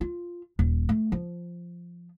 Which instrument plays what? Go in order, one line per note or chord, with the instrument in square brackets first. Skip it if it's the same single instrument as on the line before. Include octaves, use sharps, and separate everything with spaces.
[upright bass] F4
D#1
A3
F3